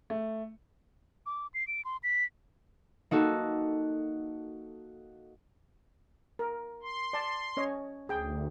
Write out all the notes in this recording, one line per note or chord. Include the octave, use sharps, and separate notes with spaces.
A3
D6
C7
D7
C6
B6
A#3 D#4 F#4 A4
A#4
C6
D5 A5
C#4 C#5 D#5
D2 G#4 G5